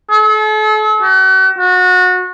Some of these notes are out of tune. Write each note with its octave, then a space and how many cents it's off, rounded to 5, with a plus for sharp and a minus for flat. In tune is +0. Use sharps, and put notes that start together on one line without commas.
A4 -40
F#4 +40
F#4 -25